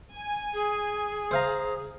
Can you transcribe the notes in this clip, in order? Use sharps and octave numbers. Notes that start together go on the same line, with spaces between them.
G#5
G#4
C5 F5 A#5